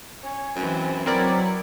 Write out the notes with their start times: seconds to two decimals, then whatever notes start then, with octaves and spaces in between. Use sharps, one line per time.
0.23 C#4 C#5
0.56 F#2 E3 G#3 C4
1.06 F#3 B3 C4 E4 A#4 D5